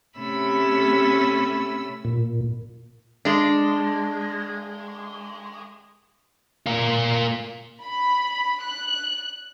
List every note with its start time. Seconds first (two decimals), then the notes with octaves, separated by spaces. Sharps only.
0.19 C3 A3 C#4 B5 E6
2.05 A#2
3.25 G#3 D4
6.66 A#3 F4
7.85 B5
8.63 F#6